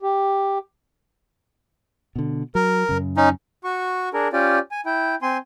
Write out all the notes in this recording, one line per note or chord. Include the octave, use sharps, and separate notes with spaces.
G4
B2 D3
F#3 A#4
F#2 C#3
C#4 D#4
F#4 C#6
D4 G#4 A#4
C#4 F4 G4 D5
G#5
E4 G5
C4 G#5 C6